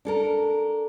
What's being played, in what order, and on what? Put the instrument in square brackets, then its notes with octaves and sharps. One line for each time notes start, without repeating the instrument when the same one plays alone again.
[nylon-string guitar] D4 A4 A#4